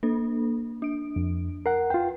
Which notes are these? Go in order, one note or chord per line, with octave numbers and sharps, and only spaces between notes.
A#3 D4 A4
D4 D7
F2
A#4 F#5 C7
F4 B4 G5